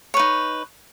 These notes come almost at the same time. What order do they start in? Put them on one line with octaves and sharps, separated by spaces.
C#5 B4 D#4